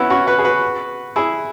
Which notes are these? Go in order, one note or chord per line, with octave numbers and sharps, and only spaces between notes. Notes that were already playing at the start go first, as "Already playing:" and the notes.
Already playing: B3 C#4 E4 F#4
C#4 F#4
F#4 B4
G#4
F#4 B4
E4 G#4